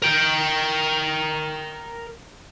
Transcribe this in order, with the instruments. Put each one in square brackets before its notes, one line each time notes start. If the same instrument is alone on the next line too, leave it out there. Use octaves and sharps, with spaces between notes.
[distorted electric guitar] A#4 G5